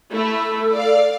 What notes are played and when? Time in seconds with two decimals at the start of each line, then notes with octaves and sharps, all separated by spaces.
0.12 A3 E4 A4
0.72 D5 F5